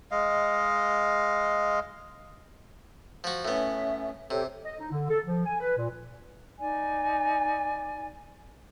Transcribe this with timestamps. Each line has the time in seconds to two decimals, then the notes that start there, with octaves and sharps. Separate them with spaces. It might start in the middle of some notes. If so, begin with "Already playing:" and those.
0.11 G#3 D#5 F5
3.24 F3 F#4
3.45 A2 B3 C#4 E5
4.31 C3 G4 A4 C#5
4.65 D#5
4.80 D#4
4.92 D3
5.09 A4
5.26 F3
5.46 G#5
5.59 B4
5.76 A#2
6.60 D#4 D5 G#5